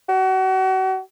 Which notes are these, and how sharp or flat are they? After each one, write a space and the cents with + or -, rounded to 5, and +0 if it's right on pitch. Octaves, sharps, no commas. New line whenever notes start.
F#4 +35